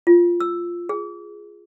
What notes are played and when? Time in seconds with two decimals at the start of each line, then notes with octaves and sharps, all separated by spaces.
0.07 F4
0.40 E6
0.89 G#4